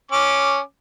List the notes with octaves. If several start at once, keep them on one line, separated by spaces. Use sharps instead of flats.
C#4 D6